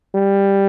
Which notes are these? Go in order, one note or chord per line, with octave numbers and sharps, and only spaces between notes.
G3